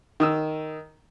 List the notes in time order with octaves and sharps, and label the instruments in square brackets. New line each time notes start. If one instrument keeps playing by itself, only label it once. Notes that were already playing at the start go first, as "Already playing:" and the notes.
[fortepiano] D#3 D#6 E6